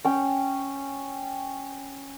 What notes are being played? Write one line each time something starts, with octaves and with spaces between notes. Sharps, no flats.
C#4 G5